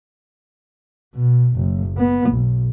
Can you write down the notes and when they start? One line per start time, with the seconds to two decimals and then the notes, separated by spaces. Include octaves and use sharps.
1.15 B2
1.56 F#1
1.97 B3
2.30 B1